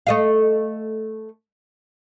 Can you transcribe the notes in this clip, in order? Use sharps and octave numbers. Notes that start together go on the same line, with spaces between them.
A3 D#5 F5